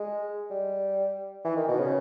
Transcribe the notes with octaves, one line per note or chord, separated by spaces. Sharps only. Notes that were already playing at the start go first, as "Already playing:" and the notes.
Already playing: G#3
G3
E3
D#3
B2
C#3